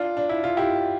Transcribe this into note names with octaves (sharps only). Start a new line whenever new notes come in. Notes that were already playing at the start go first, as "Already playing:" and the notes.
Already playing: D4 F4
D4
E4
F4
E4 G4